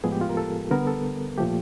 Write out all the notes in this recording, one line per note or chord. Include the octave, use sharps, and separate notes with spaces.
A2 F3 G#3 B3 G#4
G4
F4
A#4
A4
D3 G3 B3 A#4
A4
A#2 F3 A3 G4